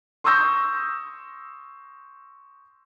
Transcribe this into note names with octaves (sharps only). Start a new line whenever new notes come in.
C6 C#6 D#6 E6 G6 A#6